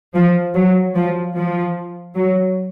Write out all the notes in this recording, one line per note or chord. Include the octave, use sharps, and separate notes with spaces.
F3
F#3
F3
F3
F#3